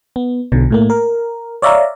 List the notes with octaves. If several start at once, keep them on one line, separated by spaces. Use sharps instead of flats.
B3
B1 B2 D3
A2 A3 A#3
A#4
C#5 D5 E5 F5 A#5